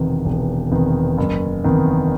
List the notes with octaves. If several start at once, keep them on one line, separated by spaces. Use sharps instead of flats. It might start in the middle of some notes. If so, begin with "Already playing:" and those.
Already playing: E1 E2 C3 D#3
E1
E2 C3 D#3
F#1
E2 C3 D#3